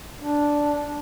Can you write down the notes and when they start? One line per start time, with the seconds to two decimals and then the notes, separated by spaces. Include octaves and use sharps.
0.18 D4